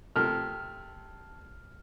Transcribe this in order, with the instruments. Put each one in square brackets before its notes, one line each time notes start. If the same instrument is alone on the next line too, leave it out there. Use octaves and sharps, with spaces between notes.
[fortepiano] C3 A3 A#4 [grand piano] A5 F6